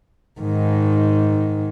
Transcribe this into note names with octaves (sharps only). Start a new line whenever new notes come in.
G#2 D#3